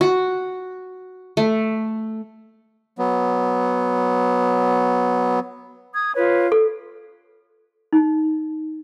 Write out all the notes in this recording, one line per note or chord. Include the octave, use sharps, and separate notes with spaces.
F#4
A3
F#3 B3
D#6 G#6
F4 B4 C#5
A4
D#4